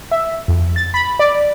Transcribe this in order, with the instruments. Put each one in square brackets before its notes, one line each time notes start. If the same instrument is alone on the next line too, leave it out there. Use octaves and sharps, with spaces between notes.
[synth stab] E5
F2
A6
B5
D5